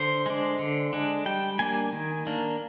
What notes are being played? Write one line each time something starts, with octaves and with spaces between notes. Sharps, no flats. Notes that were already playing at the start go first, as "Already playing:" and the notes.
Already playing: D3 C5
G#3 D4
D3
G#3 D4
G3 G5
A#3 D4 G#5
D#3
A#3 D4